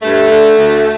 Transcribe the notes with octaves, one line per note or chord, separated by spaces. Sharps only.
G2 A3
D3
D2